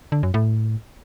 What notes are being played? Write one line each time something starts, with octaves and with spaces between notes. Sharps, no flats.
D3
F#2
A2